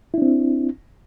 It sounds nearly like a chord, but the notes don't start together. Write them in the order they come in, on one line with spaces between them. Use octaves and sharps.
E4 D4 C4